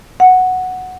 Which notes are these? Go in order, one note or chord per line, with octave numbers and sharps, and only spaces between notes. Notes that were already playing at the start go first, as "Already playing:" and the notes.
F#5